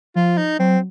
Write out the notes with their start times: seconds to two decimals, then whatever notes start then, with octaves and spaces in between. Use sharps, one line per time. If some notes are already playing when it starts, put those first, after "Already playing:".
0.16 F3 F4
0.38 D#4
0.59 F#3 C4